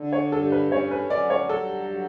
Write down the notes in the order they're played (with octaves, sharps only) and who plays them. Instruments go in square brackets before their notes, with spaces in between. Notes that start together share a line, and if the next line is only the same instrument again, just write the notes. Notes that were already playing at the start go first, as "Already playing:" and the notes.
Already playing: [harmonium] D3
[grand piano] C#5
[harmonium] G2 [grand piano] A4
[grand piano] B4
[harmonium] C#4 [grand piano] C#5
[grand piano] B4
[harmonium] F#3 [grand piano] D5
[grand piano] C#5
[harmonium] G2 [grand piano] A4
[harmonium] F#3